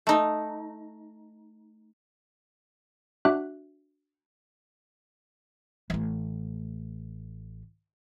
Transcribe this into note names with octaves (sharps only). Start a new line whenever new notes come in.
A3 D#4
D4 F#4 E5 F#5 D6 F#6
A1 A3